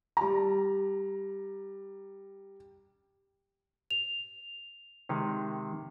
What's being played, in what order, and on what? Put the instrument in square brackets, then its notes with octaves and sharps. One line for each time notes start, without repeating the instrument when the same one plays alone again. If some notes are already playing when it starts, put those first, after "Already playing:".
[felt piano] G3 A#5
[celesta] F7
[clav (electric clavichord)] C3 D#3 G#3